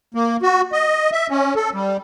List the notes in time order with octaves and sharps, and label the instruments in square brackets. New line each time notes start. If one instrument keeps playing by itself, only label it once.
[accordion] A#3
F#4
D#5
E5
C#4
A4
G3